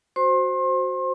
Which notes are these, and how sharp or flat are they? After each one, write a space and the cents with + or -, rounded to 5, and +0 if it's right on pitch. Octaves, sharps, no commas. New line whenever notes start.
F#4 +0 C5 +0 C6 +35